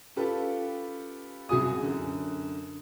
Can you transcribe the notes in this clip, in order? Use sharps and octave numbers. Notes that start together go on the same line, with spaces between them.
C#4 F4 G4 A4 B4
C2 F#2 F#4 G#4 D#6
F#2 D3